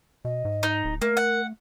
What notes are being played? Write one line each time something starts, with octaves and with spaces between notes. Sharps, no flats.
B2 D#5
G#2
D#4
D1
A3 A#3 A#4
F#5